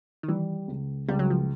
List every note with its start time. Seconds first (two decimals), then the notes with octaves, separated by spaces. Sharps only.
0.23 D#3
0.28 E3 G3
0.68 C#2
1.08 C#2 G3
1.19 F#3
1.30 F3